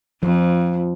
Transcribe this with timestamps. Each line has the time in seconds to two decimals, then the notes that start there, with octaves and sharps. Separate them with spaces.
0.23 F2 F3